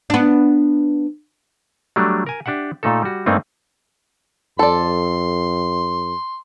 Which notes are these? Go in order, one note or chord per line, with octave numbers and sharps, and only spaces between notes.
B3 D4
F#3 G3 A3 D4
A#4 G#5
D4 G4 E5 F#5
A#2 A3 D#4 A4
G3 F#4
G2 A3 A#3 C4 D#4
F2 A4 D5 C6